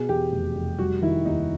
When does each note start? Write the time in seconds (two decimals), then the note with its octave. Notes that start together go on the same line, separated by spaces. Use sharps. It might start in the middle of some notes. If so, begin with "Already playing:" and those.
Already playing: B2 G#4
0.09 E2 G4
0.32 F1
0.55 F1
0.79 G3 F#4
1.02 D#3 E4
1.25 D#2 D#4